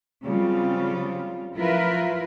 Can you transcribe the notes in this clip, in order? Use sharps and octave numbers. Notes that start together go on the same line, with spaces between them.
C#3 F#3 G3 C4 F4
F3 F#3 E4 F4 A#4 B4